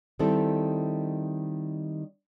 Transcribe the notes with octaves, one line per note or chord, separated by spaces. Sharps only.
D#3 G3 C4 E4 A4